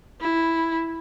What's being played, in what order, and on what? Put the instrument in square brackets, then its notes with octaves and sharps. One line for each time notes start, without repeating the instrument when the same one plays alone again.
[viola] E4